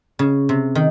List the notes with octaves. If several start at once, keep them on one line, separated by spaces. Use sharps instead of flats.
C#3
C3
D#3